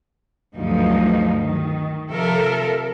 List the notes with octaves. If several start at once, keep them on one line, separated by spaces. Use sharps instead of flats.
D2 G2 F3 F#3 D#4
D#3
C3 F3 A4 A#4 E5